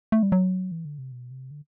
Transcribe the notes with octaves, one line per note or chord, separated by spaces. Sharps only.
A3
G3
F#3
E3
D3
C3
B2
C3
D3